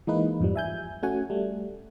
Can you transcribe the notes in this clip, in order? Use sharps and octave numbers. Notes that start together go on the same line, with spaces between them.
E3 G#3 A#3 D#4 B4
F2 G#2 F3 G3
E5 G#5 G6
A3 C#4 F#4 F#5 G#5
G3 A3